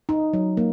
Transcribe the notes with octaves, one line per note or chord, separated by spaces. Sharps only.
D#4
F#3
A#3